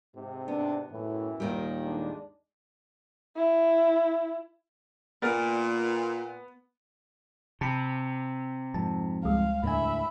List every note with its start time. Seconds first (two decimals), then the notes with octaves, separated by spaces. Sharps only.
0.16 G#2 C3
0.48 B3 D4
0.91 F#2 A2 E3
1.40 D#2 A#2 D#3 G3
1.84 G#3 A3 D4
3.36 E4
5.22 A#2 B3 A#4 D5
7.61 C3 A5 B5
8.74 F2 G#2 A5
9.24 C#2 G3 G#3 F5
9.63 D#2 A2 D3 E5 G#5 B5